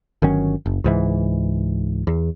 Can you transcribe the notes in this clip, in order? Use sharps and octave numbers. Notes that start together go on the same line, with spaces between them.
G1 D#3 F#3 C#4
F#1
C#2 G#2 E3
E2